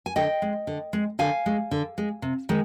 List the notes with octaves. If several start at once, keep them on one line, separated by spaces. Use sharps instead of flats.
G#5
D3 D#5 G5
G#3
D3
G#3
D3 F5 G#5
G#3
D3
G#3
C3
D#3 G#3